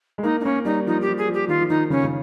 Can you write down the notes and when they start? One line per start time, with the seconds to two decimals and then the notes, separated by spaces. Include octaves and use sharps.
0.18 G#3
0.23 A#3 D#4
0.40 D#4
0.44 A#3 C#4
0.65 G3 D#4
0.86 F3 D#4
1.01 G4
1.07 F3
1.17 G#4
1.28 F3
1.33 G4
1.48 D#3 F4
1.60 F3
1.69 D#3 D#4
1.90 C#3 C#4
2.04 C#3